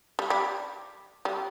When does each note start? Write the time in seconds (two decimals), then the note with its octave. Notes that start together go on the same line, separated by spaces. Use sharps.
0.19 G3
0.30 G3
1.25 G3